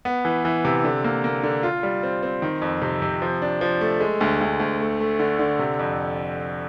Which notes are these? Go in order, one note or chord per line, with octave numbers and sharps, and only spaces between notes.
B3
E3
E3
C3
D3
A#3
A#3
D3
F4
G3
C4
C4
D#3
F2
C3
C3
F3
D4
F3
A3
G#3
D2
D2
D2
A3
A3
D3
D3
C3
F2